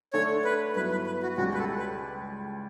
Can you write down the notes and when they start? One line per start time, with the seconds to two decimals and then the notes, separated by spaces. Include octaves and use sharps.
0.13 D3 A3 D4 A4 C#5
0.44 B4
0.75 G2 F#3 B3 E4 B4
0.91 B4
1.06 B4
1.23 F#4
1.38 C#2 C#3 G3 F#4
1.54 B4
1.58 A4
1.79 B4